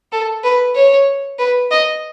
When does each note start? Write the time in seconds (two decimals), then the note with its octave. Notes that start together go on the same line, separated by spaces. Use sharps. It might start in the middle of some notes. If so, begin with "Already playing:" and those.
0.12 A4
0.43 B4
0.76 C#5
1.39 B4
1.71 D#5